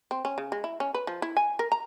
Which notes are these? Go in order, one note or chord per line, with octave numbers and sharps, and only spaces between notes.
C4
C#4
C#3
G#3
E4
C#4
B4
F3
E4
G#5
A#4
A#5